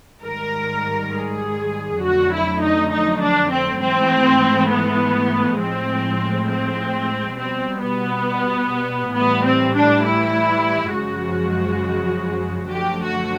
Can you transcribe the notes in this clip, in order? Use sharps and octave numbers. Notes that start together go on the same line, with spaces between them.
G#2 D#3 G3 A#4
G#4
F2 D3 F#3 A3 F#4
E4
D#4
D#4
D4
C4
G#2 E3 A3 C4
B3
A2 F3 G#3 C4
C4
B2 G3 C4
B3
A2 E3 G3 B3
C4
D4
E4
F#2 C#3 F3 G#3 F#4
F#2 D3 F3 A3 G4
F#4